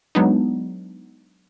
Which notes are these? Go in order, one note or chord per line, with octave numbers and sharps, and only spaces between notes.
F#3 G#3 B3 D4 D#4